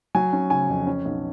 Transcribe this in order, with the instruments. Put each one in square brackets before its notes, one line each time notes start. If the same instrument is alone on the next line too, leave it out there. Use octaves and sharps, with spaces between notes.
[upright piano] F#3 G#5
C#4
C#3 G#5
F2
C#4
B1